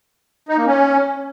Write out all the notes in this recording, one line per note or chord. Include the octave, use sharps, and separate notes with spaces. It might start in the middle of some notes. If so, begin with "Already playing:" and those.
D#4
A#3
C#4